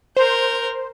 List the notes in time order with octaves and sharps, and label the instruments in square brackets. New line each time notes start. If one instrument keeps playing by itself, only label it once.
[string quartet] A#4 G6 [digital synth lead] C5